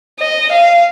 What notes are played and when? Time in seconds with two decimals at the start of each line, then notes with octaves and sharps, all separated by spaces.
0.20 D#5
0.52 F5